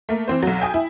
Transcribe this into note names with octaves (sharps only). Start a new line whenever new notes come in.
A3 A#3
E3 C4 C5
B1 F#3
G5 G#5 D#6
E4